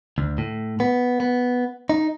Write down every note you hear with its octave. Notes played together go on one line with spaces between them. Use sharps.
D2
A2
B3
B3
D#4